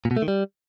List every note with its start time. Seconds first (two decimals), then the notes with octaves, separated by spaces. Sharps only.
0.05 A#2
0.11 B2
0.17 A3
0.22 D#3
0.28 G3